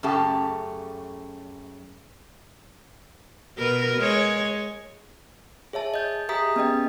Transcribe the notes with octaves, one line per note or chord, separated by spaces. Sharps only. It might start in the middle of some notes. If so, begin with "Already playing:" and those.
F#2 C#3 A3 G4 A5
B2 A#4 B4
G#3 C#5
G#4 C#5 E5 A5
D#5 G6
G4 G#4 E5 A#5 D#6 B6
B3 C#4 D#5 G5